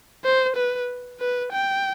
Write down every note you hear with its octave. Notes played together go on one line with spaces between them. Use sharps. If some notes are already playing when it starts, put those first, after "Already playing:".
C5
B4
B4
G5